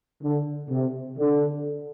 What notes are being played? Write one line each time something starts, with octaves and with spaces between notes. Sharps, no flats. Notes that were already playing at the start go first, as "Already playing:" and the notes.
D3
C3
D3